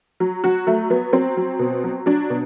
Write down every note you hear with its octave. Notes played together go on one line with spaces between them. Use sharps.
F#3
F#3 F#4
F#3 A3
F#3 B3
F#3 C4
F#3
B2
F#3
F#3 D4
B2